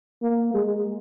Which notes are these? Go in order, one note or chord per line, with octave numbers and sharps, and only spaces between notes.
A#3
G#3